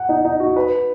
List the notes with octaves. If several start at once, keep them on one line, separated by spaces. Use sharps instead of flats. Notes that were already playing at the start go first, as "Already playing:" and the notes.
Already playing: F#5
D#4
D#4
F#4
B4